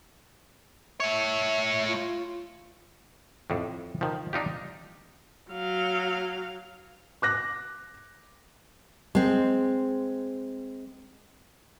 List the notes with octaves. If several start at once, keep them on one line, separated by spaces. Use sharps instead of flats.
A3 C#5 E5
F4
F2 A2
D#3 F3
D4 D#4 F4 G4
F#3 F5
D6 F#6 A#6
G#3 C4